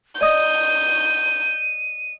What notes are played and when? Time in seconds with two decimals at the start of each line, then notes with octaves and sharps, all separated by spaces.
0.21 D5 D#5 D#6 G6 D#7